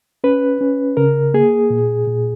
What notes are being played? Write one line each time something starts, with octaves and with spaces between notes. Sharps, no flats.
C#4 B4
C#4
C#3 A#4
A#3 G#4
A#2
A#2